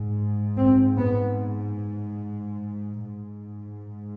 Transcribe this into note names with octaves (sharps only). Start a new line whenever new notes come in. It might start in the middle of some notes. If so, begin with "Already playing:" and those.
Already playing: G#2
C4
B3
G#2